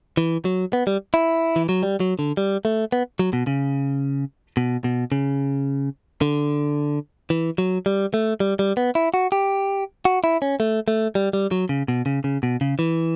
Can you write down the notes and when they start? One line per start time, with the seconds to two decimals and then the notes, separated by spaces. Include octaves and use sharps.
0.17 E3
0.45 F#3
0.73 B3
0.87 G3
1.14 E4
1.56 E3
1.69 F#3
1.83 G3
2.00 F#3
2.19 D3
2.37 G3
2.65 A3
2.92 B3
3.19 F#3
3.33 B2
3.47 C#3
4.57 B2
4.84 B2
5.12 C#3
6.21 D3
7.30 E3
7.58 F#3
7.86 G3
8.14 A3
8.40 G3
8.59 G3
8.77 B3
8.95 E4
9.14 F#4
9.32 G4
10.05 F#4
10.24 E4
10.42 C#4
10.60 A3
10.88 A3
11.15 G3
11.33 G3
11.51 F#3
11.69 C#3
11.88 B2
12.06 C#3
12.24 C#3
12.43 B2
12.61 C#3
12.79 E3